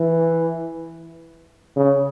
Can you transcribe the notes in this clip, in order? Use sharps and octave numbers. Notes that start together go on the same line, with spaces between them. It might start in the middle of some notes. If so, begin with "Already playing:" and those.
Already playing: E3
C#3